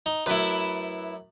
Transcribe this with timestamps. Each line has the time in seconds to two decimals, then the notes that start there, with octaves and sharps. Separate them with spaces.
0.06 D#4
0.26 F#2 A3 E4 B4